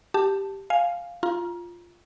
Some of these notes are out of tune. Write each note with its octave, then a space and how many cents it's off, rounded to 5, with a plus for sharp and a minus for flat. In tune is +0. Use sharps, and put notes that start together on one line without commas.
G4 +0 A5 +0
F5 +0 G#5 +0
F4 -5 A#5 +25